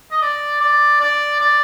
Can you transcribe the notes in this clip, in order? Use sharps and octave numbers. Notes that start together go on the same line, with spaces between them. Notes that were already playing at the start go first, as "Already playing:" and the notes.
D#5
D5
D5
D5
D5